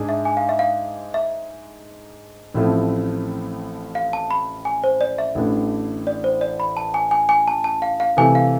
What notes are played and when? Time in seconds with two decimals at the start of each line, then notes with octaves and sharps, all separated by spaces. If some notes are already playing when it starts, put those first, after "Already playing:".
Already playing: G#2 G#3 D4 G#4
0.09 E5
0.25 G#5
0.37 F5
0.49 E5
0.59 F5
1.14 E5
2.54 A1 A2 F3 A3 C4
3.95 F5
4.13 A5
4.31 B5
4.65 G#5
4.84 C5
5.01 D5
5.18 E5
5.35 A1 A2 E3 A3 D4
6.07 D5
6.24 C5
6.41 D5
6.60 B5
6.77 A5
6.94 G#5
7.11 G#5
7.29 G#5
7.48 A5
7.64 A5
7.82 F5
8.00 F5
8.17 C3 E3 A3 G#5
8.35 F5